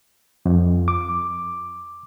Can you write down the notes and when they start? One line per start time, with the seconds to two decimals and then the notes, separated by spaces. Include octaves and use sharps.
0.46 F2
0.88 D6